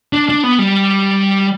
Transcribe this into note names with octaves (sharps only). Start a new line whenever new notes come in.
D4
D4
B3
G3